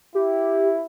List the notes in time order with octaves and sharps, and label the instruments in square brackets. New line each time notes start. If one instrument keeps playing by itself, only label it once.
[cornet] E4 [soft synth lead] G4